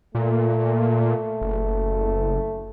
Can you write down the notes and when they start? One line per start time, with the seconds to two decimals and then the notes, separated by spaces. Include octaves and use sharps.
0.15 A#2 A3
1.41 F#1